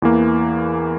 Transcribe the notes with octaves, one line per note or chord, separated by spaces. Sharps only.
E2 E3 A#3